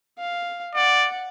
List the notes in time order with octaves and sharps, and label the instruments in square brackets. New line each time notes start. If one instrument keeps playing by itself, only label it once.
[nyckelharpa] F5
[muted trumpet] D5 [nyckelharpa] F#5